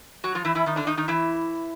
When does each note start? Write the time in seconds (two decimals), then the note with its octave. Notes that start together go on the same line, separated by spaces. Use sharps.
0.24 F#3 F#4
0.35 F3 F4
0.45 E3 E4
0.55 E3 E4
0.66 D#3 D#4
0.76 D3 D4
0.87 D#3 D#4
0.97 D#3 D#4
1.08 E3 E4